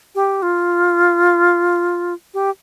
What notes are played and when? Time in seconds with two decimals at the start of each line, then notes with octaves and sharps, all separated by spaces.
0.15 G4
0.42 F4
2.34 G4